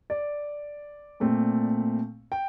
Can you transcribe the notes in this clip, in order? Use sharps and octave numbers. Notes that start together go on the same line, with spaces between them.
D5
A#2 A3 C4
G5